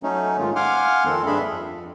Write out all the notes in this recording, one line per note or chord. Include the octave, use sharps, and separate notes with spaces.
F#3 A3 C#4 D#4
G#2 D#3 G#3 F4
F5 F#5 G#5 C6 D6 F6
F2 D#3 C4 A4 C6
G2 D4 G#4 E5 B5
F2